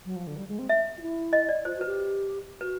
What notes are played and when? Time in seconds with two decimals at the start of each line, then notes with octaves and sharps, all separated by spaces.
0.05 F#3
0.16 F3
0.27 D3
0.37 G3
0.48 G#3
0.59 C4
0.69 E5
0.98 F4
1.02 E4
1.33 D#5
1.49 D5
1.65 F4 C5
1.76 F#4
1.81 B4
1.86 G4
2.61 F#4 B4